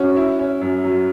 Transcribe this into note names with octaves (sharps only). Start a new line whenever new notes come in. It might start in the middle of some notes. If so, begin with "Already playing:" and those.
Already playing: C#4 F#4
E4
C#4
F#2
F#3